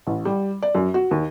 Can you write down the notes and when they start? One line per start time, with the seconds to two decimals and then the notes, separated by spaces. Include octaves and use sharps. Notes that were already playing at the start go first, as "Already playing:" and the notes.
0.07 A1
0.25 G3
0.63 D5
0.75 F#2
0.94 F#4
1.11 D#2